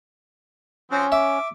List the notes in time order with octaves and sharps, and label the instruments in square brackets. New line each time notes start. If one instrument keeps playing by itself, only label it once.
[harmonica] F3 C4 F#4 [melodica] C#4
[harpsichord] E5 [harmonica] D6